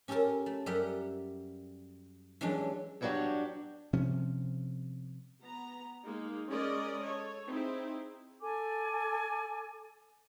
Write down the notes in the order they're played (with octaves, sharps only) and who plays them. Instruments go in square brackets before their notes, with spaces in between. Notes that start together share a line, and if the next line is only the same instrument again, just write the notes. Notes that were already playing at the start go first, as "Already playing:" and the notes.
[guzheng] C#4 G4 A4 A#4 A5
A3
F#2 G3 G4 A#4 E5 F#5
E3 F#3 G#3 C#4 D4 G4
[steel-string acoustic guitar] E2 G2 F#3 D4 F#4 G4
[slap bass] C3 F3 C#4
[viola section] B3 A#5
G#3 A#3 D#4
G#3 C#4 A#4 D5 D#5
A4 C#5
C4 D#4 E4 G#4
[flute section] A4 G#5 D6